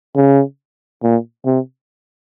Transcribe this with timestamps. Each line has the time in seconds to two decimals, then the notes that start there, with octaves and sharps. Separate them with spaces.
0.16 C#3
1.03 A#2
1.46 C3